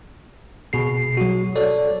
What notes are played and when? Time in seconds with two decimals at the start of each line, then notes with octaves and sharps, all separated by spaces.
0.73 B2 G#4 C7
1.17 F#3 F#4
1.56 A4 C#5 D5